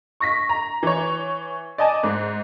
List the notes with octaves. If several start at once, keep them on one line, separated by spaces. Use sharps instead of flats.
C#6 A#6 B6
A#5
E3 C#5
D5 D#5 G#5 A5
G#2